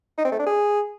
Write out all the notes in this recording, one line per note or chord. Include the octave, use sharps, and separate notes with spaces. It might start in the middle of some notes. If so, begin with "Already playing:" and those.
D#4
C4
A3
D4
G#4